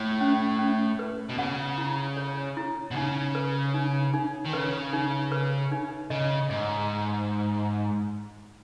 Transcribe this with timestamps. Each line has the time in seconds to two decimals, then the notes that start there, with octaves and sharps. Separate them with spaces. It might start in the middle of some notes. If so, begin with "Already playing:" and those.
Already playing: A2
0.21 C#4
0.59 C#4
0.99 B4
1.29 B2
1.38 C#3 F#5
1.78 E4
2.17 C#5
2.57 E4
2.91 B2
2.95 C#3 D#4
3.35 B4
3.74 D#4
4.14 D#4
4.45 D#3
4.53 C#3 B4
4.93 D#4
5.32 B4
5.71 D#4
6.10 C#3 D#5
6.50 G#2 D#5